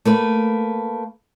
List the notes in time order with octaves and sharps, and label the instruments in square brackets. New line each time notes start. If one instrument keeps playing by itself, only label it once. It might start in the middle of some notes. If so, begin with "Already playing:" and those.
[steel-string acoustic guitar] A3 A#3 B4